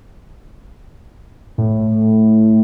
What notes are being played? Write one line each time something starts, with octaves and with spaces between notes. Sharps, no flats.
A2